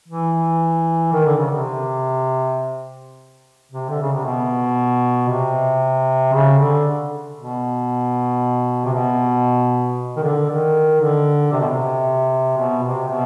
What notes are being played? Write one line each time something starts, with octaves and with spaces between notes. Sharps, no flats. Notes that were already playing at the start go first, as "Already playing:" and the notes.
E3
D#3
D3
C#3
C3
C3
D3
C#3
C3
B2
C3
C#3
D3
B2
C3
B2
D#3
D3
D#3
D3
C3
B2
C3
B2
C3
B2